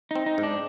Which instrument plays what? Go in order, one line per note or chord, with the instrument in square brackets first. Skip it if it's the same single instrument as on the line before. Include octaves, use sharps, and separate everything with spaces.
[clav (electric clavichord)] C4 [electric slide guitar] D#4
[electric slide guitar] D#4
[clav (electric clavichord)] G#2
[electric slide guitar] D4